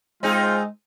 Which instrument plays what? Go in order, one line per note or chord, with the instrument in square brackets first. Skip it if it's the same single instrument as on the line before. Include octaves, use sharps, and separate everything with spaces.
[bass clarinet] G#3 [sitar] C4 D#4 G#4 [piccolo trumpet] F4